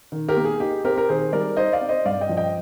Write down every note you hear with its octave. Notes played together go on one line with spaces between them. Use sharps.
D#3
G4 A#4
A#3
G#4
D#4 G4
C4 G4 A#4
A#4
D#3 G#4 C5
G3 A#4 D5
D#4 C5 D#5
D5 F5
C4
C5 D#5
G2 D5 F5
D#5 G5
F3
D#5 G5